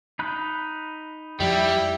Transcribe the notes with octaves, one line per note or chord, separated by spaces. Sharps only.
D#4 B5 F#6
F2 G3 E4 G4